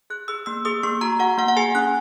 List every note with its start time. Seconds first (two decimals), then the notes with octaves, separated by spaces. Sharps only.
0.10 G#4 F#6
0.28 G#4 E6
0.46 A#3 E6
0.65 G#4 D#6
0.83 A#3 C#6
1.01 F#4 A#5
1.19 F#4 F#5
1.38 A#3 F#5
1.48 F#5
1.56 G#4 G#5
1.75 C#4 F#6